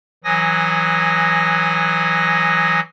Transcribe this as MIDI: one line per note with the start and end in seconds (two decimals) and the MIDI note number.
0.24 2.80 52
0.24 2.80 54
0.24 2.80 80
0.24 2.80 87
0.24 2.80 94